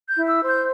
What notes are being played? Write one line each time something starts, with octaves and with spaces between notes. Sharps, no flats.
G6
E4
E6
C5
G6